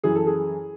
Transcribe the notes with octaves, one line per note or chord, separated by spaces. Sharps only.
F#2 E3 G#4
A4
G#4